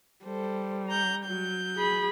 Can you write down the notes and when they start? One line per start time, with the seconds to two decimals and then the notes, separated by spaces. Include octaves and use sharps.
0.25 G3 A4 C5
0.88 A#5 G6
1.24 F#3 G6
1.76 G#4 B5